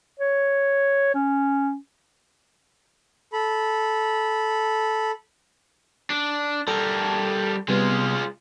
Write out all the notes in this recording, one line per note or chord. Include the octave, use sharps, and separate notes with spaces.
C#5
C#4
A4 B5
D4
G3 A4 A#4 A5
C3 G3 G#3 B3 F4